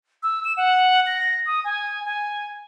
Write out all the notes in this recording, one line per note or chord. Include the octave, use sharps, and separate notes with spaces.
E6
E7
F#5
A#6
D#6
G#5
G#5